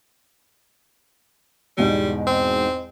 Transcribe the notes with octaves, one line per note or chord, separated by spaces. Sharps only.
E2 G#2 B2 G3
C4